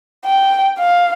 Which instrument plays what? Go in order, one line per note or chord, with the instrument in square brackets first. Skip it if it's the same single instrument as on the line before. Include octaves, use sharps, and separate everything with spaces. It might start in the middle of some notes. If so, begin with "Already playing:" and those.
[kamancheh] G5
F5